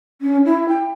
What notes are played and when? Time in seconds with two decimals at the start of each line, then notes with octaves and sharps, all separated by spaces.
0.21 C#4
0.45 E4
0.69 G5